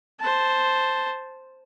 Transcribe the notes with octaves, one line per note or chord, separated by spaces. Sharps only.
C5 A5